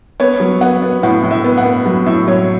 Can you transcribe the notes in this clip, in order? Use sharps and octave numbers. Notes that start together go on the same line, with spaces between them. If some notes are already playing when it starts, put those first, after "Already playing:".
B3 C#5
F#3
B3 F#5
B3
A2 F#5
A2
E5
B3
F#5
B3
F#3
A2 E5
F#3 C#5